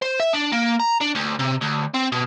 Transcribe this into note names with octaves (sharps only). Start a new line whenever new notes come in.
C5
E5
D4
A#3
A#5
D4
D2
C3
D2
C4
B2